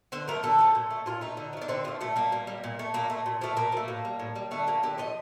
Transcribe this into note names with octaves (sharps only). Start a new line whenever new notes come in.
D3 C5
F3 A3 A#4
D3 A4
F3 A3
A#2
A3
A#2 F4
A3 D#4
D3
F3 A3
D4
D3 C4
F3 A3 A#3
A#2 A3
G3 A#3
A#2
G3
A#2
A3
A#2 A#3
A3
A#2
F3 A3
A#2 A#3
F3
A3
A2
G3
A2
G3
D3 A3
F3 A3 A#3
D3 G4
F3 A3 D#5